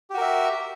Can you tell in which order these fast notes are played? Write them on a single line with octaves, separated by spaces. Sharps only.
G4 F#4 A#4 E5